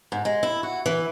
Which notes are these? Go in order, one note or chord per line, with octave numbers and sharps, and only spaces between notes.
G#2
G#3
E4
F#4
E3